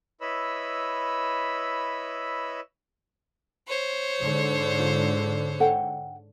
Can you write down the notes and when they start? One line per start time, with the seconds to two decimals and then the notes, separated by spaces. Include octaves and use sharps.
0.21 E4 B4 C#5 D#5 B5 E6
3.68 C5 C#5
4.21 G#2 D3
4.79 F4
5.60 A4 F#5 G5